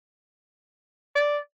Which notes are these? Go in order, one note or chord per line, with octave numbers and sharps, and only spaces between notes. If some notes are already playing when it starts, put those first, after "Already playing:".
D5